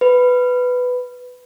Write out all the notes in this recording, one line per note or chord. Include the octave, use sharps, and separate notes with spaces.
B4